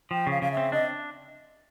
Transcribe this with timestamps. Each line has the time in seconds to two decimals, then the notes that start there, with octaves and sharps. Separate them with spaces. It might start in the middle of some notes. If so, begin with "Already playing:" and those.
0.11 F3 G5
0.27 C#3 F5
0.42 C#3 F5
0.52 E5
0.57 C4
0.72 D4 D#5